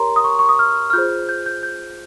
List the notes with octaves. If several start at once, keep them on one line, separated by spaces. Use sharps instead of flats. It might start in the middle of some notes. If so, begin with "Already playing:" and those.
Already playing: G4 A#4 C#5 A#5 C6
D#6
C#6
C#6
D#6
F6
F6
F4 G#4 C5 G6
G6
G6
G6